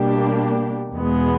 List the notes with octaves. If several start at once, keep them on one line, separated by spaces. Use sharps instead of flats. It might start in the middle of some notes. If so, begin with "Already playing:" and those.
Already playing: B2 G3 A#3 D4 G4
E2 B2 G#3 B3